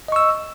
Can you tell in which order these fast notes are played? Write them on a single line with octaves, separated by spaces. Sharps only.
D#5 C#6 E6